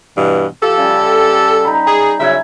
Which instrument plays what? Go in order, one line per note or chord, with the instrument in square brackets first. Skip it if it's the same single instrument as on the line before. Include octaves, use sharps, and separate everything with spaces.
[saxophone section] G2 B2 E3
[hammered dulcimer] F3 E5 [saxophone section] G4 A4
[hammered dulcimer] C#3 G3
D#4 A#5 B5
[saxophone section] G#4
[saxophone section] C#3 F#3 E5 [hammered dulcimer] E4 G#5